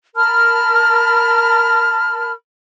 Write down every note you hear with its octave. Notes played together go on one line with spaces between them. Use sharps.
A#4 A5 B5 F6